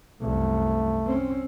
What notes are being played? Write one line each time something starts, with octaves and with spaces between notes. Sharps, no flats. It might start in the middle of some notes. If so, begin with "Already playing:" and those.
C2 F#2 A3
C4 C#4